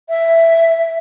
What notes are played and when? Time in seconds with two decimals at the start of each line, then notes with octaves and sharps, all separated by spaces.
0.09 E5